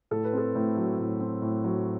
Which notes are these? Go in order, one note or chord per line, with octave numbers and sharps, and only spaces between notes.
A2 A4
B4
C4 A4
A2
F#3
A2
C4
A2
F#3